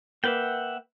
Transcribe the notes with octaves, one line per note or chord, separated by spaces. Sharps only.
A#3 B4 E5 F#5 G5